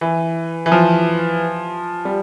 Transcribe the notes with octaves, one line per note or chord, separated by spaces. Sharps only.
E3
E3
F3
G3